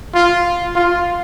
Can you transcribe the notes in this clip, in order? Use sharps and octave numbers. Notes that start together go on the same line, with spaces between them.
F4
F4